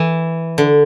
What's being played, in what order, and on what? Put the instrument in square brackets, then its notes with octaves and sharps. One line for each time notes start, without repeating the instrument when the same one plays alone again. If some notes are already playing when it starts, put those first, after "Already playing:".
Already playing: [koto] E3
D3